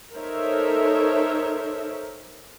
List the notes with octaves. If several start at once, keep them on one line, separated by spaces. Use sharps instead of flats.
D#4 A4 A#4 C5 C#5 E5